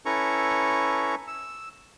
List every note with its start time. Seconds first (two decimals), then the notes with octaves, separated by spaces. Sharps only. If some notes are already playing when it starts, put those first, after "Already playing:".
0.06 C#4 E4 A4 B4 A#5 C#6
1.27 E6